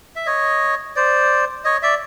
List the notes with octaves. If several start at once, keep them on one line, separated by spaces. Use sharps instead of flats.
E5
C#5 D#5
C5 D5
C#5 D#5
D5 E5